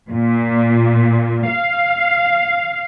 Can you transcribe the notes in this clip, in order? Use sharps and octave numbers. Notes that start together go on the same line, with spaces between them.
A#2
F5